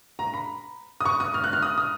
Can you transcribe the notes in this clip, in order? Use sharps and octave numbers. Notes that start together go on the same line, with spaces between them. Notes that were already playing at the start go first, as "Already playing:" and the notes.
A#5
B5
D#6
C#6
D#6
F6
F#6
F6
D#6
D#6